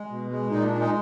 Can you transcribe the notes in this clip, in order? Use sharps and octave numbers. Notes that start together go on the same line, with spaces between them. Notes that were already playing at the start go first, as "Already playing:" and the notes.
Already playing: G#3
B2
G#3
A#2 D#4
D4
G#3
D#4